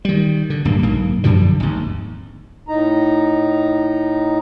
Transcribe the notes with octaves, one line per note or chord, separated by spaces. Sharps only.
D#3 G3
D3
D1 G2 A#3
B1 G#2 A#3
F#2 D3 F3 G3
G#1 D#2
A2 D#4 A#5